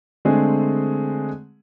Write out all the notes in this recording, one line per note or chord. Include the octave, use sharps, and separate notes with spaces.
D3 G#3 A3 C4 G#4